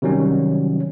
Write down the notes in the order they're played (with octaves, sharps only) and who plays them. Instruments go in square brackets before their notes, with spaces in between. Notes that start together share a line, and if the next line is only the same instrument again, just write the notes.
[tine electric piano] C3 D#3 F#3 G3 C#4